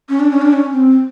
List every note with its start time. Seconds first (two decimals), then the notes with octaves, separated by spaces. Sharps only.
0.09 C#4
0.20 D4
0.31 C#4
0.42 D4
0.53 C#4
0.72 C4